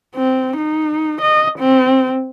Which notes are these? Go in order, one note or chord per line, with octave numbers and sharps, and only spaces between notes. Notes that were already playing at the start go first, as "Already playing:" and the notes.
C4
D#4
D#5
C4